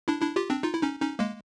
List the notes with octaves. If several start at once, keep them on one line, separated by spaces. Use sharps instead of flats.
D4 E4
D4 E4
F4 G4
C4 D4
D#4 F4
E4
C#4 D#4
C#4 D#4
G#3 A#3